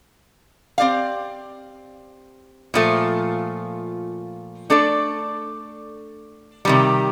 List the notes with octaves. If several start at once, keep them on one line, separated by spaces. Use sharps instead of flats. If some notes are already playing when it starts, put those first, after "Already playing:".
C4 G4 D5 F5
A#2 F3 A3
A3 D4 A4 D5
C3 D#3 G3